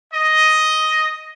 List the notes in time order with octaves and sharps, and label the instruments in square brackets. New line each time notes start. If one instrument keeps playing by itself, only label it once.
[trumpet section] D#5